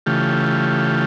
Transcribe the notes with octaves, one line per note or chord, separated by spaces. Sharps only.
C#3 E3 A3 F4 G4